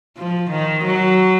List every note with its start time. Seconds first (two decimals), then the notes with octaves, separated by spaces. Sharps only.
0.17 F3
0.51 D#3
0.85 F#3